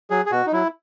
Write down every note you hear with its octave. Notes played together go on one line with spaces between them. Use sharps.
F#3 G#4
G#4
B2 F#4
D#4
F#3 E4